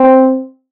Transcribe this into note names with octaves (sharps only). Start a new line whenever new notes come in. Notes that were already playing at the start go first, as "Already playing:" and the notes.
Already playing: C4